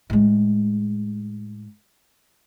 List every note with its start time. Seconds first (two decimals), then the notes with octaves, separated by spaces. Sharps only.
0.10 A2 G#3